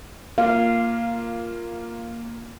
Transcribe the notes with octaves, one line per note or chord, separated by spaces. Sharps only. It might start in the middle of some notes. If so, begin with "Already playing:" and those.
A#3 F4 F5